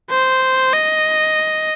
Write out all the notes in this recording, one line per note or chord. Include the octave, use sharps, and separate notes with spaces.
C5
D#5